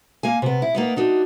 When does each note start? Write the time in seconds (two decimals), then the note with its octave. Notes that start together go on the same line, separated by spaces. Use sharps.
0.23 A#3 F5 G#5
0.42 C3 B3
0.62 E4
0.75 A#3 B3 D#4
0.96 D4 D#4 F#4